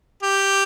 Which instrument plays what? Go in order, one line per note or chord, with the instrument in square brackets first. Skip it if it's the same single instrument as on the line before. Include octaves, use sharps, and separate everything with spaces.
[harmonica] G4